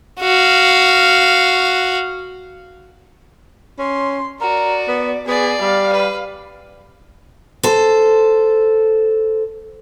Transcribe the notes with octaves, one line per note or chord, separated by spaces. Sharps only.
F#4 F5
C#4 C6
F#4 A#4 D5
B3
B3 G#4 D5
G3 F5
B4
A4 C5